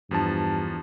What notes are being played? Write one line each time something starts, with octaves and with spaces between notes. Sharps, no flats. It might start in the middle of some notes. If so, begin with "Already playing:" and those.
E2 G2 F3 A5